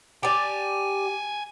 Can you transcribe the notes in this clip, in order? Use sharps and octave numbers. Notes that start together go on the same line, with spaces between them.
G4 D5 G5 G#5